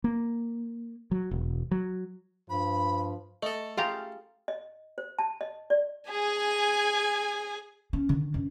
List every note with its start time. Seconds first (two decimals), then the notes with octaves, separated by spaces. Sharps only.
0.04 A#3
1.11 F#3
1.31 E1
1.71 F#3
2.50 G2 F3 B5
3.43 A3 A4 D#5
3.77 F4 G4 G#4 F5 A#5
4.48 D#5
4.98 C5
5.19 A5
5.41 D#5
5.70 D5
6.10 G#4 G#5
7.93 C#4
8.09 D3 D#3
8.34 F#2